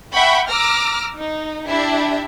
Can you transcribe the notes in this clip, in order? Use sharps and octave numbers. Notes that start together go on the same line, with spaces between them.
E5 F#5 G5 B5 C#6
A#5 D6 E6 F6 A#6
D#4
D4 E4 G4 E5